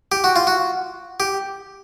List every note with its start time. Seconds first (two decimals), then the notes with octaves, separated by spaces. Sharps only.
0.12 G4
0.24 F#4
0.36 F4
0.47 F#4
1.20 G4